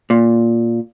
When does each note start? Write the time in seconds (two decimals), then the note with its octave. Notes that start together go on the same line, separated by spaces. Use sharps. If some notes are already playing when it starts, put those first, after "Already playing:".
0.10 A#2